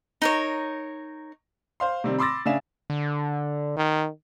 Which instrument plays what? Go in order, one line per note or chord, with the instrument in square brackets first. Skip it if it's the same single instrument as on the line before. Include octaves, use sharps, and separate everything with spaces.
[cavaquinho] D#4 A#4 C#5
[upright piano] C5 F5 C6
C3 D#3 G3 C4
B5 C6 D6 E6 A6 A#6
C#3 D4 E5 F5 G#5 E7
[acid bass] D3
[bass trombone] D#3